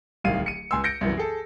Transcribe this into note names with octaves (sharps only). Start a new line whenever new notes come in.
D1 C2 D#3 F5 D#7
C#7 D#7
C#2 G#5 C6 E6
G6 A#6 C#7 D7
C2 F#2 E3 B3
G#4 A4